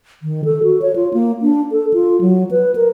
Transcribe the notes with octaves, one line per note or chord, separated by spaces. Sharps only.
D#3
A4
F#4
C#5
F4
A#3
D4
A4
F4
F#3
B4
A#4